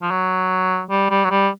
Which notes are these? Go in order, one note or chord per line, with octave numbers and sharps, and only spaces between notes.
F3
F#3
G3
G3
F#3
G3